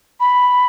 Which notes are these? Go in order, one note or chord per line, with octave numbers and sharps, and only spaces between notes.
B5